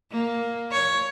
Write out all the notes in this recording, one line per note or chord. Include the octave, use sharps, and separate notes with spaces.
A#3
C#5